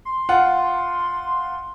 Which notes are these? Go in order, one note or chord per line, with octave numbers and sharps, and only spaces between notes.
C6
F4 F#5